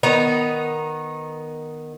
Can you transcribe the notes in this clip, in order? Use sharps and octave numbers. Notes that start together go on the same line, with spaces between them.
D#3 B3 D#4 A#5